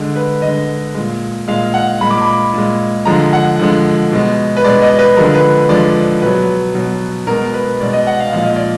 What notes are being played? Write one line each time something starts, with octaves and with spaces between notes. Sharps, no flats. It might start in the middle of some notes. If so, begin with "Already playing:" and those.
Already playing: D3 G#3
B4
D3 G#3 D#5
A#2 G#3
A#2 G#3 F5
F#5
A#2 G#3 B5
D6
B5
A#2 G#3
D3 F3 G#3 A#5
F#5
D3 F3 G#3
B2 G#3
B4
B2 G#3 D5
D#5
B4
D3 F3 G#3 A#4
B4
D3 F3 G#3 D5
B2 F#3 B4
B2 F#3
B2 G#3 A#4
B4
B2 G#3 D5
D#5
F#5
F5
A#2 F3 G#3 F5
D#5
D5